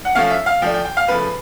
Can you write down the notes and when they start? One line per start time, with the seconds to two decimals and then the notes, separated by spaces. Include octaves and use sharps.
0.05 F#5
0.15 F3 A3 C#4 F5
0.31 E5
0.46 F5
0.62 F3 A3 D4 G5
0.74 G5
0.85 G5
0.97 F5
1.08 C#3 F3 A3 B4